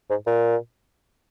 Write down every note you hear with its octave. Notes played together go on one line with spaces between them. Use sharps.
G#2
A#2